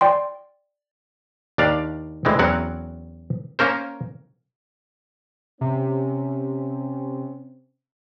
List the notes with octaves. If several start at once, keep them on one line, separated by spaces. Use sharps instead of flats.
D5 G5 C6
D#2 D4 D5 F5
D2 E3 G#3 C4
E2 F#3 C4 C#4 A#4 F#5
A#3 C#4 A#4 C5
C3 C4 C#4